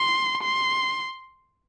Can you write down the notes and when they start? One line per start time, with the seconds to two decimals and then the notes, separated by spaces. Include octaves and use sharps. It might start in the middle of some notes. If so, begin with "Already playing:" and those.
Already playing: C6
0.43 C6